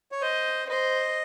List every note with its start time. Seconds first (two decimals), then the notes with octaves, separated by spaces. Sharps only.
0.12 C#5
0.22 C5 D#5
0.69 C5 D#5